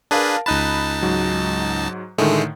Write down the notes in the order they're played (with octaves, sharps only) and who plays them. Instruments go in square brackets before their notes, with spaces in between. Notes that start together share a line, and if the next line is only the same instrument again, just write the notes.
[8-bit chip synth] D4 G#4 B4 [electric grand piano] A#4 F5 A5
[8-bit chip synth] C#2 D#4 A5 [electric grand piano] B5 F#6 D#7
[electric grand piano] G#2 F#3
[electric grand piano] A2 D3 D#3 [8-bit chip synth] G#3 A3